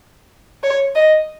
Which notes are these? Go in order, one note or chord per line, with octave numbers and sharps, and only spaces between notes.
C#5
D#5